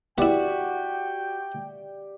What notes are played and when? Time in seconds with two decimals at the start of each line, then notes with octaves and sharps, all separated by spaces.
0.18 B3 E4 F#4 G4 D5 E5 G5